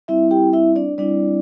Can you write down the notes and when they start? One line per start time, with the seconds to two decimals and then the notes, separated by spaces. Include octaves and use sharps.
0.08 G3 C4 E4 E5
0.31 G4 G5
0.53 E4 E5
0.76 D4 D5
0.98 G3 C4 D4 E4 D5